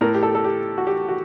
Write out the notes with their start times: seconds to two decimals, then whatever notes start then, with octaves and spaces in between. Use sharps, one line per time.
0.01 A2 A#4
0.14 G4
0.23 A4
0.35 A4
0.44 G4
0.78 F#4
0.87 G4
1.09 F#4